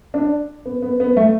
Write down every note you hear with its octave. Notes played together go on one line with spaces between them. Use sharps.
D4
B3
B3
B3
A3